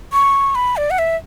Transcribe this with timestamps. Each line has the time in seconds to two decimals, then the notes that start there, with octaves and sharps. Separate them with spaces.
0.13 C#6
0.55 B5
0.77 D5
0.90 F#5
0.99 E5